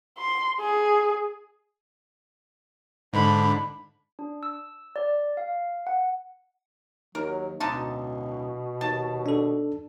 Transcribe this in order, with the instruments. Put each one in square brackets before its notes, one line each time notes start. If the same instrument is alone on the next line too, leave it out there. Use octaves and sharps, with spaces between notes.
[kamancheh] C6
G#4
[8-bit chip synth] G#2 D3 [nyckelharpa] D4 B5
[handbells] D4
E6
D5
F5
F#5
[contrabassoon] D#2 [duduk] F#3 [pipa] A#4
[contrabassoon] D1 [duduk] B2 [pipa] D3 D#4 A5
[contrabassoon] D#2 [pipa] A5
[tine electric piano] D4 A4